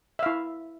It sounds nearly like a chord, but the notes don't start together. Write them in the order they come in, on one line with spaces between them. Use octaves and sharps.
E5 F5 E4